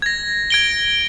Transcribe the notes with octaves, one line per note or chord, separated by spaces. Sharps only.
G#6 A#6
G#6 D7 G7